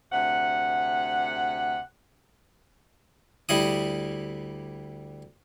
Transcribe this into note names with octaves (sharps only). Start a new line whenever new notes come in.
D2 C3 F#5
D2 G3 E4 D#6